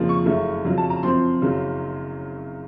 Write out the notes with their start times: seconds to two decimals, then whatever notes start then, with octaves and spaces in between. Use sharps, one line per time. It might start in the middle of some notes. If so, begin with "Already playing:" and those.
Already playing: F2 C#3 F3 A#3
0.09 C#6
0.26 F#1 F#2 C#3 A3
0.65 F2 C#3 F#3
0.78 A5
0.90 A#5
1.03 F#2 F3 C4 C6
1.42 F#1 F#2 C#3 F#3